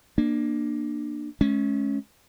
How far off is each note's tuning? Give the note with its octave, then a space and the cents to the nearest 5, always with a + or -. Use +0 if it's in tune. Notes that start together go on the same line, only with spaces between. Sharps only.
A#3 +10 D4 +20
G#3 +45 C#4 +0